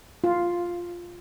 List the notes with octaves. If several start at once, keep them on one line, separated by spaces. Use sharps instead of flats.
F4